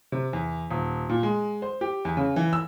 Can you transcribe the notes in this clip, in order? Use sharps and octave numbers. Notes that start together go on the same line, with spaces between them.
C3
E2
D#1
A#2
G#3
C5
G4
E2
C#3
E3
E6